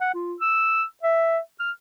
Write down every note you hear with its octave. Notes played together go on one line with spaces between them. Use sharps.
F#5
F4
E6
E5
F6